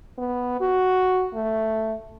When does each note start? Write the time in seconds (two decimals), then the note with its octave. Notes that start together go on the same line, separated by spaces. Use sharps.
0.18 B3
0.61 F#4
1.34 A3